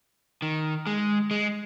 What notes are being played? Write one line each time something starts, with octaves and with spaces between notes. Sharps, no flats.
D#3
G#3
G#3